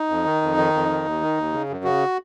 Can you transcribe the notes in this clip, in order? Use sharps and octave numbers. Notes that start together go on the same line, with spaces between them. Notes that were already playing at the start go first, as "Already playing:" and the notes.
Already playing: D#4
F2
D#3
F2
D#3
F2
D#3
D#2
D#3
D#2
C#3
F#2
C#3 F#4